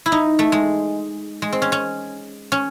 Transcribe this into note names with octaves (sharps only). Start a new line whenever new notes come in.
E4
D#4
A3
G#3
G#3
C4
C#4
C#4
C#4